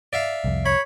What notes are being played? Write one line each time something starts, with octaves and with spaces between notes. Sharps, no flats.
D5 E5 F5
C2 F2
C#5 B5